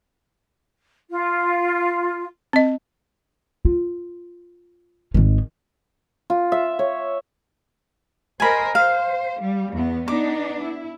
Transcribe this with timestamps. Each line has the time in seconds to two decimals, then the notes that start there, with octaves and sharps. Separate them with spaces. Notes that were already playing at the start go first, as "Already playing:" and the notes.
1.10 F4
2.53 C4 D#5
3.65 F4
5.14 G#1 D#3
6.30 F4
6.52 E5
6.79 C#5
8.40 A#4 C5 D#5 G#5 B5
8.75 C5 F5
9.40 G3
9.73 E2 B3
10.08 B3 D4 D#4 D6
10.62 E4